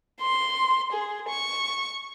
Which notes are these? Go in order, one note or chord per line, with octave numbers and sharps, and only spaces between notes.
C6
G#4
C#6